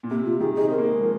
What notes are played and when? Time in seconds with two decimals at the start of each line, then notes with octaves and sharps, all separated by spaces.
0.03 A#2
0.10 C3 A#3
0.25 F4
0.40 D#3 G#4
0.55 D#4 G#4
0.68 C4 A#4
0.78 A#3
0.89 G#3
1.01 F3